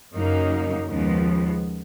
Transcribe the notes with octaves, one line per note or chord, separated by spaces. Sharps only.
F#2 C#3 F#3 A#3 D#4
D#2 C#3 F3 G#3 B3